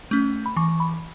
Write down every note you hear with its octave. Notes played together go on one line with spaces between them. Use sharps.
A3 C#4
B5
E3 C#6
B5